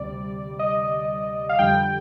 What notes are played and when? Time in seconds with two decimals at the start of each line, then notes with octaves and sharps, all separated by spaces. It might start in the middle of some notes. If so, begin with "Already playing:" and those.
Already playing: D2 C3 G3 D5
0.59 D#5
1.49 F5
1.59 F2 D3 G3 G5